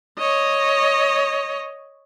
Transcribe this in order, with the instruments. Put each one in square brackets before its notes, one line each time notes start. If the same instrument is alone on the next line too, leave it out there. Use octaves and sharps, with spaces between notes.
[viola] C#5 D#5